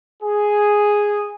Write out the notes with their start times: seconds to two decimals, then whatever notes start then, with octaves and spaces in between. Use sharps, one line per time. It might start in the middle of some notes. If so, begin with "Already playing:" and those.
0.23 G#4